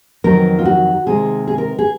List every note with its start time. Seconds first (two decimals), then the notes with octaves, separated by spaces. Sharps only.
0.24 F2 D#3 F#3 A#4
0.59 F4
0.65 F#4
1.06 C3 D#3 G#3 G#4
1.47 G#4
1.58 A#4
1.79 G#4